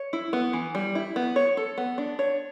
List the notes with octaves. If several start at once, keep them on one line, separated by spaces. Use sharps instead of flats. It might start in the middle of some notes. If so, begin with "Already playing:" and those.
Already playing: C#5
E4
B3
E3
G3
E4
B3
C#5
A4
B3
D4
C#5